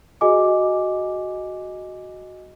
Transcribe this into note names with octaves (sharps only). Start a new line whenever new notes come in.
F#4 G#4 D#5 G#5 D6